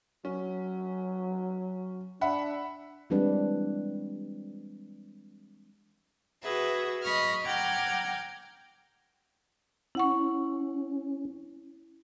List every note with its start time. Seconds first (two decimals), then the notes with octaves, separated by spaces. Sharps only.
0.25 F#3 C#4
2.21 D4 E5 F#5 B5
3.10 E3 G3 G#3 C4 D4 B4
6.42 F#4 G#4 B4 E5
7.03 D#5 B5 C#6 D#6 F6
7.45 F#5 G5 A#5 D6 F6 G#6
9.95 C#4 E4 F#5 C#6